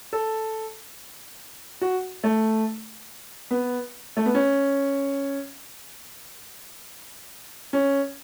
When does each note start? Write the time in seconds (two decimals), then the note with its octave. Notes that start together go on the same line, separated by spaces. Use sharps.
0.13 A4
1.81 F#4
2.24 A3
3.51 B3
4.17 A3
4.26 B3
4.35 C#4
7.73 C#4